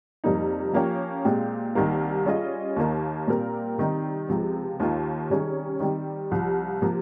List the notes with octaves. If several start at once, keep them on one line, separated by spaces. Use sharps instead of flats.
F2 C3 G3 A#3 D#4
F3 A#3 C#4 G4
A#2 G#3 C4 G4
C2 C3 D#3 G3 A#3
G3 C#4 F4 G#4 D#5
D#2 D#3 A#3 D#4
A#2 G3 C4 G4 A#4
C3 D#3 G3 C4 D#4
C#2 C3 F3 G#3 C4
D#2 D#3 A#3 F4
C3 D#3 G3 C#4 G#4
D#3 G3 C4 G4
C2 C3 F3
C3 F3 A#3